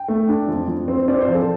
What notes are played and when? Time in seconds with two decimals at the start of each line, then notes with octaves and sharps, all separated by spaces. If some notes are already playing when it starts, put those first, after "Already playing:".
Already playing: G5
0.08 A3
0.29 D4
0.48 F2
0.68 F2
0.88 C4
1.08 C4 D5
1.21 C5
1.28 F3
1.35 A4